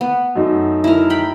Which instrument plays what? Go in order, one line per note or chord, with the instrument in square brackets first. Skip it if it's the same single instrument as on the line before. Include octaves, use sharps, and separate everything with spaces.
[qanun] B3
[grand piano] F#2 A3 D#4
[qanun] E4 A#4
G5 B5